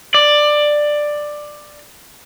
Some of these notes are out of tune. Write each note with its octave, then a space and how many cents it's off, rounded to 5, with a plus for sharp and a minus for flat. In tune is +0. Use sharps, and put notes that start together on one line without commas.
D5 +10